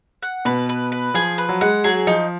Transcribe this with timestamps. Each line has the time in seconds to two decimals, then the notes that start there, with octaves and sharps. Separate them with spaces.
0.23 F#5
0.45 B2 B4
0.69 B4
0.92 B4
1.14 F3 G#4
1.38 B4
1.49 F#3
1.61 G#3 F#5
1.84 F#3 G#4
2.07 F3 D#4